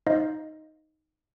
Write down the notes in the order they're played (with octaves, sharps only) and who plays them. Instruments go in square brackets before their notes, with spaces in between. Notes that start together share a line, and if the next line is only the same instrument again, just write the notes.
[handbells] D#4 C5 D#5 F5